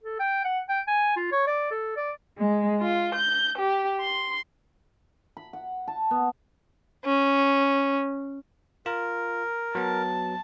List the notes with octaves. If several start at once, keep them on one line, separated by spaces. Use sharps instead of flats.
A4
G5
F#5
G5
G#5
F4
C#5
D5
A4
D5
G#3
F4
G6
G4
C6
B5
F#5
A5
B3
C#4
F4 A#4
F#3 B3 A5